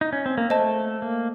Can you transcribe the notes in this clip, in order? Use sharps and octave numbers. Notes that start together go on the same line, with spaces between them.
D#4
C#4
C4
A#3
A3 C5 D#5 A5
A#3